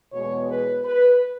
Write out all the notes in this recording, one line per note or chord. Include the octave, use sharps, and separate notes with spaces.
E2 B2 G#3 B3 C#5
B4
B4